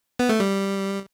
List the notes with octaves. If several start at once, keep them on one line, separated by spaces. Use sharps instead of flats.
B3
A3
G3